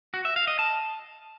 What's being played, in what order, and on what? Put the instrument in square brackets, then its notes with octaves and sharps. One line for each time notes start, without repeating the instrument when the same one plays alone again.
[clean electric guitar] F#4
E5
F5
D#5
A5